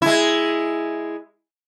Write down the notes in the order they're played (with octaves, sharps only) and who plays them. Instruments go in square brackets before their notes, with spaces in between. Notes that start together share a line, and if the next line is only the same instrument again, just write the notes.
[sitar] G#3 E4